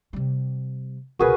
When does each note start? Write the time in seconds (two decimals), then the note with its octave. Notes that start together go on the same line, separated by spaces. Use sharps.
0.13 C3 G3
1.19 C#2 B2 F#4 G#4 A#4 B4